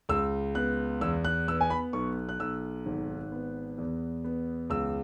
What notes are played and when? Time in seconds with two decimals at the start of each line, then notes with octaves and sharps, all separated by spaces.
0.09 C#2 E6
0.55 B3 F#6
1.01 E2 E6
1.25 F#6
1.48 B3 E6
1.61 G#5
1.70 B5
1.93 B1 C#6
2.29 F#6
2.40 B1 E6
2.86 G#1
3.32 B3
3.78 E2
4.24 B3
4.70 C#2 E6